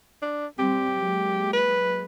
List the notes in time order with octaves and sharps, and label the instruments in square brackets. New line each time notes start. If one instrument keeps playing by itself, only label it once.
[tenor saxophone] D4
[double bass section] G3 C4 [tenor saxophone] G4
[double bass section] F#3 G#3 A#3
[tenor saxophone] B4